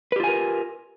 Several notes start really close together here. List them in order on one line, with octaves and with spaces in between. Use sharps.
B4 G4 F4 G#5 A#4